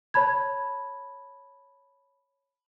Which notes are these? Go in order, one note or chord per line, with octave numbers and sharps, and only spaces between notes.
C#5 A5 B5 G#6